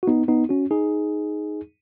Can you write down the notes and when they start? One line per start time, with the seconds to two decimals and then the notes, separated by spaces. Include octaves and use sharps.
0.03 F#4
0.08 B3 D#4
0.28 B3 D#4
0.49 C#4 F#4
0.71 D#4 G#4